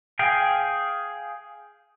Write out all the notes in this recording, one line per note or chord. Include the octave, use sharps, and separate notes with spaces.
G#4 F5 G5